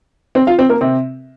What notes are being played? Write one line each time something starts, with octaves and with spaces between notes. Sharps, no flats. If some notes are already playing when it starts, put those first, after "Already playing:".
C4 C5
F4 F5
C4 C5
A#3 A#4
C3 C4